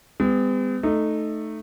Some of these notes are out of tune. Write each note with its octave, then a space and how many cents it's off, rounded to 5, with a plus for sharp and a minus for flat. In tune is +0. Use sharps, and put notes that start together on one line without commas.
G#3 -40 B3 +45
A3 +0 D#4 -15